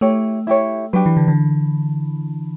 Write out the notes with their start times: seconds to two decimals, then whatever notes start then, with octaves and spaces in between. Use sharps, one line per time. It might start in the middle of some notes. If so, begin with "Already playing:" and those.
0.01 A3 E4 G4 C#5
0.47 E4 G4 C#5
0.93 F#3 D4 G4 B4
1.06 E3
1.17 D3
1.28 D3